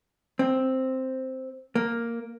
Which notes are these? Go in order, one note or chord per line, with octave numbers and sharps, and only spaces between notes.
C4
A#3